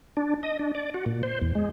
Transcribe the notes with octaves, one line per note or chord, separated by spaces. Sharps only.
D4
D#5
D4
D5
F#4
A#2
C5
E2
G#3